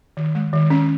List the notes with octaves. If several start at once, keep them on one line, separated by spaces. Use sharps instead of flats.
D#3
G#3
D#3
C#4